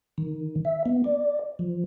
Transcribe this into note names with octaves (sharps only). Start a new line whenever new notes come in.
D#3
E5
B3
D5
F3